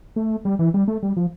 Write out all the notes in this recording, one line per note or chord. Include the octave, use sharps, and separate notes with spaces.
A3
G3
E3
G3
A3
G3
F3